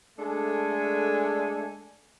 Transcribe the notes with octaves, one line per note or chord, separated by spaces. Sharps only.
G#3 A3 D4 A4 G#5